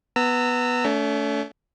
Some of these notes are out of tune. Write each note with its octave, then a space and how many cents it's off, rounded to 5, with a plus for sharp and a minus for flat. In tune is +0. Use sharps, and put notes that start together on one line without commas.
B3 +0 A#5 -35 E6 +0
A3 +0 C#4 +45